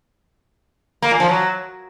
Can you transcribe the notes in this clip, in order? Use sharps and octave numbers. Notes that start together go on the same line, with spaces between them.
A#3
A#2
F3
F#3